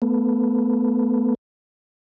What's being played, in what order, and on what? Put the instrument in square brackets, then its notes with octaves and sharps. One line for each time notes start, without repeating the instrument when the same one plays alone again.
[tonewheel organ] A3 B3